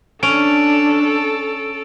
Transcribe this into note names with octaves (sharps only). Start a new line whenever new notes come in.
C#4 D4 A4 D7 F7